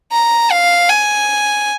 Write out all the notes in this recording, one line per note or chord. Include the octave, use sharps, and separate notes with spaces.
A#5
F5
G#5